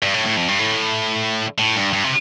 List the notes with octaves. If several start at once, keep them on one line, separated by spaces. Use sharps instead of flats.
G2
A2
A2
F2
G2
A2
A2
G2
G2
C3